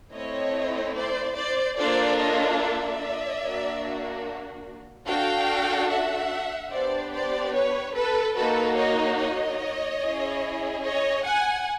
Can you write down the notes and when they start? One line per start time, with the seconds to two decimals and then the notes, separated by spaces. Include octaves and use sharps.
0.13 A3 C4 E4 C#5 D#5
0.96 C5 D5
1.36 C5 D5
1.77 A#3 D4 F4 A4 C5 D5
2.19 C#5 D#5
2.60 D5 E5
3.43 A#3 D4 F#4
5.07 D4 F#4 A4 F5 G5
5.90 E5 F#5
6.71 B3 D4 G4 C5 D5
7.13 C5 D5
7.54 B4 C#5
7.95 A4 B4
8.36 A#3 D#4 F#4 A4 B4
8.77 C#5 D#5
9.18 C#5 D#5
10.01 C#4 E4 G#4
10.83 C#5 D#5
11.24 F#5 G#5